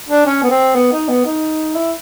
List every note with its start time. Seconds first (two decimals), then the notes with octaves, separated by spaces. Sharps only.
0.09 D4
0.26 C#4
0.43 B3
0.50 C4
0.75 B3
0.92 D#4
1.09 B3
1.25 D#4
1.75 E4